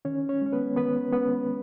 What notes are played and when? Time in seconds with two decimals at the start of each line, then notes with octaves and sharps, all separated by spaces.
0.05 D#3 C#4 C#5
0.29 C#4 C#5
0.41 G#3 C#4
0.53 B3 B4
0.76 D#3 B3 B4
1.12 G#3 B3 C#4 B4